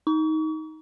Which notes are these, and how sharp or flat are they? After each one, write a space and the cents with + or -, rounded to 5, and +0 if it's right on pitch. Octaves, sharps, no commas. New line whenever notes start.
D#4 +15 C#6 +40